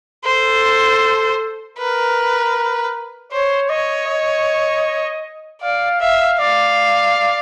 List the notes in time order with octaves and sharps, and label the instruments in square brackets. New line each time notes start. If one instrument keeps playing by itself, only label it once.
[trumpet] A4 [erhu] C5
[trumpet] A#4 [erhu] B4
[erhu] C5 [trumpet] C#5
[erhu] C#5 [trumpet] D#5
[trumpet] D#5
[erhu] D5 [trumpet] F5
[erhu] E5 [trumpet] F5
[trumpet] D5 [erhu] F5